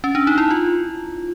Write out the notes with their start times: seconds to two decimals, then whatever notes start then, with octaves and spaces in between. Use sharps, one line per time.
0.04 C#4
0.15 D4
0.27 D#4
0.38 E4
0.51 F4